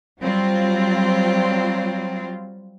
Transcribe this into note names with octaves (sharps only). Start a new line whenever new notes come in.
F#3 G3 C4 F4